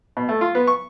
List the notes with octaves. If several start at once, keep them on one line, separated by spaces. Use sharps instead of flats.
B2
A3
F4
B3
C#6